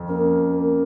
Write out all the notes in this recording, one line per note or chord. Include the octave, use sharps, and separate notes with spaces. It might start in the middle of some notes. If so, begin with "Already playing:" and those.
Already playing: F2
A#3 C#4
A#3